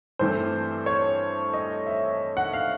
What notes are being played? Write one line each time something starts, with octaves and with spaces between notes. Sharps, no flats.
G2 E3 A3 C4 C5
C#5
D#5
E5
F#5
F5